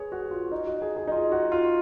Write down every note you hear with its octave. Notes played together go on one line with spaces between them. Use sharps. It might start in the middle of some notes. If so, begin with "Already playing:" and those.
Already playing: G#4 B4 C#5
F#4
F4
D#4
F#4
G#4
G#4
D#4
F4
F#4
F4